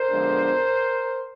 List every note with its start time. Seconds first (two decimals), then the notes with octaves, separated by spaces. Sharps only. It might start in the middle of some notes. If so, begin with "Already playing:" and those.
Already playing: A#4 C5
0.09 D3 F3 G#3 B3 D4